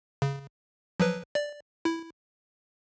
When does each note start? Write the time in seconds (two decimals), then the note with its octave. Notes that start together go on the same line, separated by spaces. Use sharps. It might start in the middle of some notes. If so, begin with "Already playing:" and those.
0.22 C#3
1.00 F3 F#3 B4
1.35 D5
1.85 E4